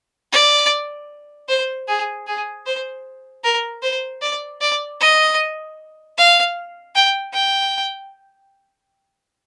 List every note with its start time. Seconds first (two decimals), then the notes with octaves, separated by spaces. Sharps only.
0.32 D5
1.49 C5
1.88 G#4
2.27 G#4
2.66 C5
3.44 A#4
3.82 C5
4.22 D5
4.61 D5
5.00 D#5
6.17 F5
6.95 G5
7.33 G5